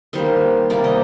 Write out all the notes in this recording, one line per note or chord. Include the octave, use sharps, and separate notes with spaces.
D#3 G3 A#3 C5
C3 G3 A#3 D5
D#5